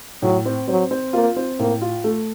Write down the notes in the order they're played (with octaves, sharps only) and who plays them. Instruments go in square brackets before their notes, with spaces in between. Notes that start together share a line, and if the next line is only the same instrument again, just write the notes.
[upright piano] A2 [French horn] F#3
[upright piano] C4
[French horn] F#3 [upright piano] C4
[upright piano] C4
[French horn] A#3 [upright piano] F4
[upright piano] C4
[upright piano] A2 [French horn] A#3
[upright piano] F4
A3